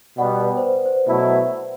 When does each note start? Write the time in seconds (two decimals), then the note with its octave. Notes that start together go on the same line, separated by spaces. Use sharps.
0.18 B2 G3 B3 D5 F#5
0.41 B4
0.57 C5
0.63 B4
0.86 C5
1.08 B2 F#3 A3 E4